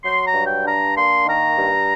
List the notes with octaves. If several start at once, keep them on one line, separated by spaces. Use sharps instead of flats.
F#3 C6
A#5
G2
G5
D4 A#5
A#3 C6
D#3 A#5
G2